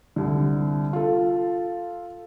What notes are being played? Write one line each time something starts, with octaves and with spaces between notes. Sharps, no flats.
C2 D3
F4 A4